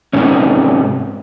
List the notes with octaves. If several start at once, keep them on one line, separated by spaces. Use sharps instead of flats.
G#2 C3 C#4